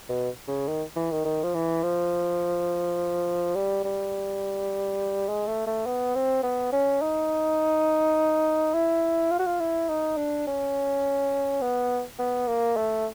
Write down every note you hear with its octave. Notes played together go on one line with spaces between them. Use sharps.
B2
C#3
D#3
E3
D#3
D#3
F3
E3
F3
G3
G3
G#3
A3
A3
B3
C4
B3
C#4
D#4
E4
F4
F#4
F4
E4
D#4
D4
C#4
B3
B3
A#3
A3